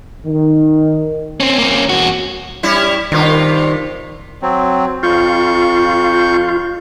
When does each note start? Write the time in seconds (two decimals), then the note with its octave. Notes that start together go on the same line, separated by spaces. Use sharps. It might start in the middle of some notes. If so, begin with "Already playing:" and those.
0.26 D#3
1.40 C4 C#4
1.58 A#3 C#4
1.90 E2 F#4
2.63 G3 C#4 E4
3.12 G2 C3 D#3 F4
4.42 F#3 C4
5.03 F2 F4 C#6 G6